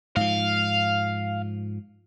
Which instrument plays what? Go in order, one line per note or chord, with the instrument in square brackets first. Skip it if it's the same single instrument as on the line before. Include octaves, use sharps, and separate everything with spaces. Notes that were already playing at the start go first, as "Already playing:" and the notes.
[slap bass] G#2 F3 [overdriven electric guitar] F5